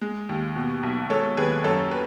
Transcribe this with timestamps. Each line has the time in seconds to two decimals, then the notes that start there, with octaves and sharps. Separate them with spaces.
0.01 G#3
0.29 D#2
0.56 B2
0.83 B1
1.10 G#3 A4 C#5
1.37 D#2 G#4 B4
1.64 F#2 A4 C#5
1.91 B4